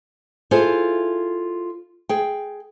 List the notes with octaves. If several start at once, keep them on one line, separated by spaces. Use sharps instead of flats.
E4 F4 G#4 A4 C5
G#4 G5